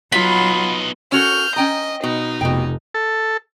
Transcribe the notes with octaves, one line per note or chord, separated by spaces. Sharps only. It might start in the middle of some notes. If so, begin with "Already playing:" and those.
F#3 B3 D#4 F4 B5
C#4 F#4 A4 F6 G6
C#4 D#5 G5 A#5
B2 D#4
F1 B2 G5
A4